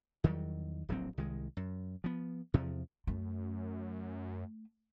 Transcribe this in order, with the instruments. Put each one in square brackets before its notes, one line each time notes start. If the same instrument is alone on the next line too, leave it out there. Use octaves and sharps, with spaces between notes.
[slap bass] E2 D#3 F#3 G3
D1 A#1 F#3 C4
C2 D#3 G#3
F#2
F3 B3
E2 C3 F3
[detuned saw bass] F#2 [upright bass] A3